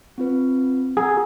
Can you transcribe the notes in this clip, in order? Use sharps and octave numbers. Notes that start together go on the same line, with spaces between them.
C4 F4 B4
G#4 F#5 A#5 E6